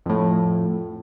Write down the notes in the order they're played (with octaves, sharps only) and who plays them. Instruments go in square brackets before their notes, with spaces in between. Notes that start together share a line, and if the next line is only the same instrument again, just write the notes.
[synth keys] F2 A2